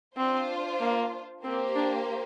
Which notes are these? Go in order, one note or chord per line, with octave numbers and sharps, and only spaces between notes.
C4 D4 F4 C5
A#3
A#3 C4 G4 C5
D4